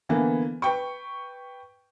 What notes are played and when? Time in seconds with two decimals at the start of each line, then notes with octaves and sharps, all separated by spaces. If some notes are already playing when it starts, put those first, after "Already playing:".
0.09 D3 E3 A#3 B3
0.62 B4 G5 C#6